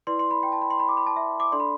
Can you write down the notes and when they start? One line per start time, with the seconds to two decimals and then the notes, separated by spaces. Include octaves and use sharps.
0.07 E4 B4 D5 C6
0.19 C6
0.31 B5
0.43 G5
0.52 A5
0.62 B5
0.70 C6
0.80 B5
0.89 D6
0.97 B5
1.07 A5
1.16 E5
1.40 D6
1.52 D4 A4 D5 C6
1.60 B5